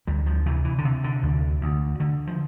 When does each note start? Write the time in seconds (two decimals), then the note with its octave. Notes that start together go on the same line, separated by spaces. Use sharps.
0.07 D2 G3
0.26 F3
0.46 C3 E3
0.64 E3
0.78 D3
0.85 C3
1.04 D3
1.23 D2
1.61 D2
2.00 D3
2.27 F3